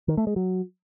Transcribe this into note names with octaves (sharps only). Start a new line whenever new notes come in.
D#3
A3
G#3
F#3